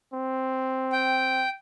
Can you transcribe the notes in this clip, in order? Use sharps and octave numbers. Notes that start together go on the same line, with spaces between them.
C4
G5